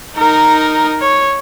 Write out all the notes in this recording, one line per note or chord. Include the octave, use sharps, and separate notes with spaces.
D#4 A#4
C#5